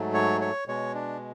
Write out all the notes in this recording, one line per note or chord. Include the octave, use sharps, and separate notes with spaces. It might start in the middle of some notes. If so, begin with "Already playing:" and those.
Already playing: G#2 F#3 A3
C#5
C#5
B2 G#3 C#5
D4